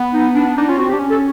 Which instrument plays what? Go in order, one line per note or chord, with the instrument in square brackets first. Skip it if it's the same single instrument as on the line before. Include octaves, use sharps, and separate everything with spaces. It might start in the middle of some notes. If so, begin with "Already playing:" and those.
Already playing: [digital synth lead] B3
[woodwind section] D#4
D4
D4
[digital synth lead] D4 [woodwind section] D#4
[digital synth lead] C#4 [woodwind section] F4
[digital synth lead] C4 [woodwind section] F#4
[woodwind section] G4
[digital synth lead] D4
C#4
[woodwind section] A4